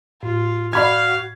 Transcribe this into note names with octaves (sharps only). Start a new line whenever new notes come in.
A2 F4
F#4 D5 F5 B5 F6 G#6